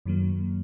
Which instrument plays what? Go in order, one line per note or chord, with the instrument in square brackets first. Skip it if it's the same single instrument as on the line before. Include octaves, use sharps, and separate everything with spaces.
[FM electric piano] F#2 D#3 F#3 A#3